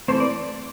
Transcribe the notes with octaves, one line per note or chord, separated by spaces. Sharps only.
E3 A3 C4 C5
D5